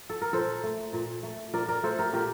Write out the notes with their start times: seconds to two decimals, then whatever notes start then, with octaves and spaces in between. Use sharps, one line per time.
0.10 A4
0.21 A#4
0.33 A#2 A4 C5
0.63 A3
0.93 A#2
1.23 A3
1.53 A#2 A#4 D5
1.69 A#4 D5
1.83 A3 A4 C5
1.99 G4 A#4
2.13 A#2 G4 A#4